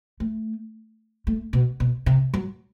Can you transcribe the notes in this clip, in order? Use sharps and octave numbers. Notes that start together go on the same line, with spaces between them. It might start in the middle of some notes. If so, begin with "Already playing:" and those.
A3
A3
B2
B2
C3
F#3